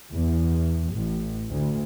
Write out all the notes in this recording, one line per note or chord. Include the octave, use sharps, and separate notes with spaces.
E2
A1
D2